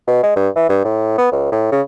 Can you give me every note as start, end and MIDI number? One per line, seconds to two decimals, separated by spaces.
0.08 0.23 47
0.23 0.34 56
0.36 0.49 43
0.56 0.69 52
0.69 0.80 43
0.85 1.14 45
1.18 1.28 59
1.32 1.48 37
1.52 1.71 45
1.72 1.82 49